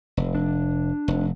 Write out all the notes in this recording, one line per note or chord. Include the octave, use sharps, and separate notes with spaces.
F1
D4
F1